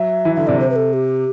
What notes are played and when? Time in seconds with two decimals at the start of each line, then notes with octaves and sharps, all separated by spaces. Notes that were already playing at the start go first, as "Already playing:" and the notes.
Already playing: F#3 E5
0.25 E3
0.36 D3 E5
0.47 C3 D5
0.60 C5
0.70 B4
0.76 A4
0.93 G4